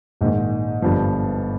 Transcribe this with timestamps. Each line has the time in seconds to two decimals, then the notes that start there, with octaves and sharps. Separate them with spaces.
0.21 A#1 G#2 D#3
0.82 G1 G2 F3